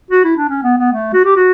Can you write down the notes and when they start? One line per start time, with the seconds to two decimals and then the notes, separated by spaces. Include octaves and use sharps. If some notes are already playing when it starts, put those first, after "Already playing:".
0.10 F#4
0.24 E4
0.37 D4
0.49 C#4
0.63 B3
0.78 B3
0.92 A3
1.13 F#4
1.25 G4
1.36 F#4